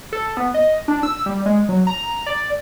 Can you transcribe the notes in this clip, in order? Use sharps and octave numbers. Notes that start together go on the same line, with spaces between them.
A4
B3
D#5
D4
E6
G3
G#3
F#3
A#5
D5